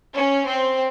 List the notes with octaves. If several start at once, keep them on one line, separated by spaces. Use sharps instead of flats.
C#4
C4